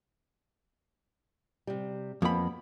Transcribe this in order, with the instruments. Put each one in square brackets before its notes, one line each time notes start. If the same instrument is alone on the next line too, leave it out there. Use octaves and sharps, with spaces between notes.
[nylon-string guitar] C3 G3
[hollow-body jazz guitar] F2 B5 [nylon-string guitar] A#3 B3